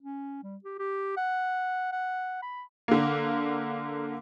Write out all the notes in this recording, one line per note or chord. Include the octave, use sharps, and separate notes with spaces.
C#4
G3
G4
G4
F#5
F#5
B5
D3 A#3